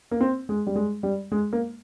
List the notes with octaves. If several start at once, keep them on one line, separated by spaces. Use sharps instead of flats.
A#3
C4
G#3
G3
G#3
G3
G#3
A#3